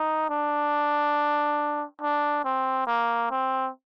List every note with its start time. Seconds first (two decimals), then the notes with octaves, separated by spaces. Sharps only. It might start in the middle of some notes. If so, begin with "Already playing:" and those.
Already playing: D#4
0.30 D4
2.01 D4
2.45 C4
2.87 A#3
3.31 C4